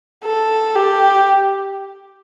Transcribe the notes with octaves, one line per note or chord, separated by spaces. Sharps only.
A4
G4